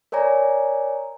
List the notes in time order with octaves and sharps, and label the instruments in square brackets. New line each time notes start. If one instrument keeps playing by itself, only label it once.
[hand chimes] A#4 C#5 D5 G#5 A#5